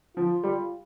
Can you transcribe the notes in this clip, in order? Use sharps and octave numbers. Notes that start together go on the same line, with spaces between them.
F3 F4
G3